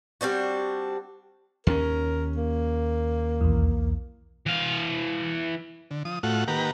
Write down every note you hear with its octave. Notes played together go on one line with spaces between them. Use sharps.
G3 C4 D4 F#4
D#2 C#4 A#4
A#3
B1 E2
E3 F5
D3
F3 D#6
A2 A3 F4 F#4 F#5
D#3 A#3 G4 B4 F#5 A#5